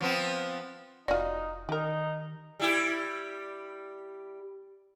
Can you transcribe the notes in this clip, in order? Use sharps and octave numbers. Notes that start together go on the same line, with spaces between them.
F3 B3 C4
F1 D#4 F4 F#4 D5
D#3 D#4 G4 A#4
G3 E4 G4